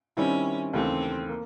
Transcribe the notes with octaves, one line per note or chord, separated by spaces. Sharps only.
D#3 G3 C4 C#4 E4
D#2 C#3 E3 A3 C4
A#3